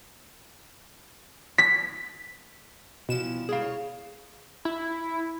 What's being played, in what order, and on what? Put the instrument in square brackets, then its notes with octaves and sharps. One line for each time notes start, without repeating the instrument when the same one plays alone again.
[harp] B6
[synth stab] B2 E7 [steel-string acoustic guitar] E3 F3 G3
[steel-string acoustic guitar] G#2 G3 [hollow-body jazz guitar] G#4 F5
[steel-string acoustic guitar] C#5
[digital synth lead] E4